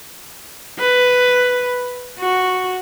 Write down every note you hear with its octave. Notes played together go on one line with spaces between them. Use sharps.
B4
F#4